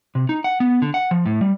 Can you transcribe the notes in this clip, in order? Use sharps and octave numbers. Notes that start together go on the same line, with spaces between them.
C3
D#4
F#5
B3
D3
F#5
F3
A2
G3